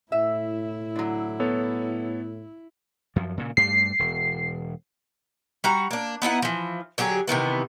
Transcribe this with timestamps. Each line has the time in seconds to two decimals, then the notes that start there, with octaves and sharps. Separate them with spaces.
0.12 A2 E4 E5
0.96 D3 F#3
1.40 B3 A4 C#5
3.16 F#2 F3
3.37 A#2 C#3
3.57 G2 G3 A3 C7
3.99 E1
5.64 G3 F#4 A#5
5.91 A#3 D4
6.22 B3 D#4 E4 F#5
6.42 E3 F3
6.98 D3 F#3 G4 G#4
7.28 C3 D#3 E3 B3